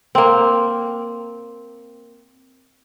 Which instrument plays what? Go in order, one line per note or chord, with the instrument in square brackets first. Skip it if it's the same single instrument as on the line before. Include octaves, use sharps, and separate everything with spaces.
[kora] A#3 C4